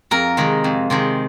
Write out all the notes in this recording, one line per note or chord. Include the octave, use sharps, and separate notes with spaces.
F2 A#4
C3 D#3 G#3
F2
C3 D#3 G#3